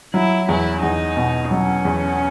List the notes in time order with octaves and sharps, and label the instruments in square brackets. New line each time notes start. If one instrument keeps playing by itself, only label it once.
[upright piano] F#3 [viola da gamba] E4
[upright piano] E2 [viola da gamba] E4
[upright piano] E2 [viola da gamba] D#4
[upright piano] B2
[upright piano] F#3 [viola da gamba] C#4
[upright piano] E2